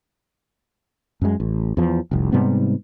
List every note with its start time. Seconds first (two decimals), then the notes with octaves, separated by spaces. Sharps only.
1.21 F#2 G#3
1.40 A1
1.77 E2 F3
2.11 F1 C2
2.32 G#2 C3 G3 B3